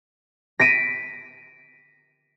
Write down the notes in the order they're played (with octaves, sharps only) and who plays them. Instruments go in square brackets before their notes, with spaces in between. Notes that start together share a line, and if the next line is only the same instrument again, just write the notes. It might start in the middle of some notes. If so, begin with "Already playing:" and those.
[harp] A#6 B6 D7 D#7